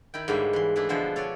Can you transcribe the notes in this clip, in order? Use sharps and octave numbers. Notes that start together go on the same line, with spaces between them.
D#3 E4 G5
G#2 D3 G3 A#3 C#5 E5
E3 C6
E3 A3 D4 E4 G#4
B2 D3 F3 E4 C5
A4 C#5 D5 G#5